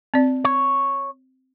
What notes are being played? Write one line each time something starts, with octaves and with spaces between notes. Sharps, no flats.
C4 D5
C#5